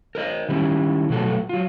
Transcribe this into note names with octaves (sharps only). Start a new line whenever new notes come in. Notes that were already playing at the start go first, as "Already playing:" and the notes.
A#4 C5 D#5
D#3 G3 A3 C4 C#4 E4
B2 F3 F#3 A3 F#4 A4
F#3 F4